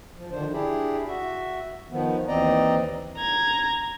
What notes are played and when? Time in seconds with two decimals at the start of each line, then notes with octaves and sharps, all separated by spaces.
0.16 F3
0.31 D3 D#3 F3 D4 C5
0.52 D4 E4 G4 G#4
1.07 F#4 E5
1.91 D#3 F3 B3
2.28 D#2 E3 C4 D5 D#5 A#5
3.17 A#5 G#6